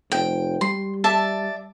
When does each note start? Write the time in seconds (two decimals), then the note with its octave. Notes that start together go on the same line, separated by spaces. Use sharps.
0.12 F1 G5
0.61 G3 C6
1.04 D5 E5 A5